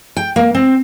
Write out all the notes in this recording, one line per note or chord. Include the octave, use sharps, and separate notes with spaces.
G5
A#3
C4